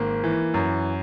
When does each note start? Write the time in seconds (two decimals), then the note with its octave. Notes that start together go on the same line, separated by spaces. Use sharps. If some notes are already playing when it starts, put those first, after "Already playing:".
Already playing: G#1 A#3
0.24 E3
0.54 F#2